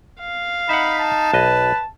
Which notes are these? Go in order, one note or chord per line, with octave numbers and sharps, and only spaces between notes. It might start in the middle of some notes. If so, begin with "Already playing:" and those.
F5
D#4 E5 F#5 B5
A5
B1 B4 D#5